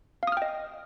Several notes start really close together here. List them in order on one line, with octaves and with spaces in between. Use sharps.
F5 D#6 F6 G5 D#5